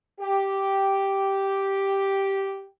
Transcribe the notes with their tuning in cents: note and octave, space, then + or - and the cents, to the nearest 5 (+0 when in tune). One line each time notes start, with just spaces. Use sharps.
G4 -5